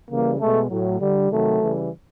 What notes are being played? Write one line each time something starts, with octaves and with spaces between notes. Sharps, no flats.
C#3 E3 G3 A#3
B2 G#3 A3
A2 F#3
D3 G3
C3 D#3 F#3 A3
C#3 E3 G3